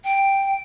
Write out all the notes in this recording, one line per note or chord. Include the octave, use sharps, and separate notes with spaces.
G5